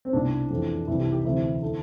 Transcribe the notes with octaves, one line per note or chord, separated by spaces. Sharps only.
C4
C2 B2 D4
F2 E3
C2 C3 E3 E4
G4
G4
D2 C3 E3 E4
D3